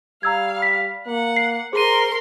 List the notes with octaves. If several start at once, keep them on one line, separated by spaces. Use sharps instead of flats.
G3 F5 A#5 E6 G#6
B6
A#3 F#5
C7
G#4 A#4 C5 C6 D#7